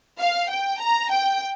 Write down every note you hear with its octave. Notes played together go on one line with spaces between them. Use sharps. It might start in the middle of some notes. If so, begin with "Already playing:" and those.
F5
G5
A#5
G5